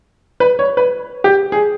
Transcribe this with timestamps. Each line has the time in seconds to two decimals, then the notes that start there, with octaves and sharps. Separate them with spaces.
0.40 B4
0.59 C#5
0.77 B4
1.24 G4
1.52 G#4